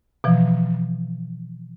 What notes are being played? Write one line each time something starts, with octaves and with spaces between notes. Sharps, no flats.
B2 E3 F3